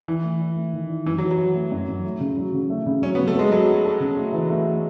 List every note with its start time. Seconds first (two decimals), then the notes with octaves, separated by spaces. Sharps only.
0.08 E3 E4
0.24 A3
0.41 E4
0.56 A3
0.73 D#3
0.89 E4
1.06 F#2 E3
1.18 F#3
1.23 E3
1.31 F#3
1.38 E3
1.55 A3
1.72 F#2
1.88 F#2
2.04 A3
2.21 C#3
2.37 F#3
2.54 C#3
2.70 A3
2.86 C#3
3.02 F#3 C#4
3.15 B3
3.19 F#3
3.28 A3
3.35 G#3 B3
3.52 F#3 A4
3.68 F#4
3.85 A4
4.00 C#3
4.17 A3
4.33 E3
4.50 A3
4.67 E3